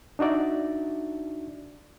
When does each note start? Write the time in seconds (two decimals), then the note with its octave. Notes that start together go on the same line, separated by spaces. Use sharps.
0.19 D4 D#4 F#4 D5 E5